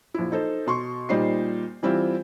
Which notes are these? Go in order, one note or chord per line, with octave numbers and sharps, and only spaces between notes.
A#1 E4
D#4 A4 C5
B2 C6 C#6
A#2 G3 D#4 C5 C7
E3 G3 C4 E4 F4